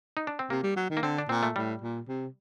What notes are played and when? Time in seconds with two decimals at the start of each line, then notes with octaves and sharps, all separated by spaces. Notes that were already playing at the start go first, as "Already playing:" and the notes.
0.17 D#4
0.27 D4
0.39 C4
0.50 C3 A#3
0.63 G3
0.76 F#3
0.90 D#3
0.97 A#3
1.03 D3 C4
1.18 D4
1.29 A#2 C4
1.43 A3
1.56 A2 G3
1.82 A#2
2.08 C3